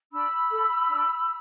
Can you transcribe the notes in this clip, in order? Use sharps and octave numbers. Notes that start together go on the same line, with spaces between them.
D4 B5 E6
A4
D4